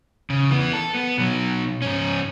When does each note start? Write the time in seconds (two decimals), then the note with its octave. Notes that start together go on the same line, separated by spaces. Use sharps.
0.30 C#3
0.49 E3 B3
0.73 A4
0.95 B3
1.18 B2 F#3
1.82 G#2 C#4